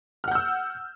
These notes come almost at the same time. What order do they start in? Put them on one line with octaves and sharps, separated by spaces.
F6 F#5 G6 E6